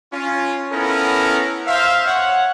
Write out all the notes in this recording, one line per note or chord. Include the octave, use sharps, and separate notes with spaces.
C#4 F4
B3 C#4 E4 A4 A#4
C5 E5 F5
C#5 F#5